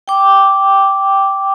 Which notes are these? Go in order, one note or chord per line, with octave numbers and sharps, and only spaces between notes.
G5 D6